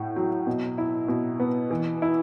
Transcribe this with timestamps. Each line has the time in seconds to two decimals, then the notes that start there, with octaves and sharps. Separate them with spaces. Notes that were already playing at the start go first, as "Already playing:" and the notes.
Already playing: A2 F#4
0.16 F#3
0.47 B2
0.78 E4
1.08 B2
1.40 B3
1.71 E3
2.02 E4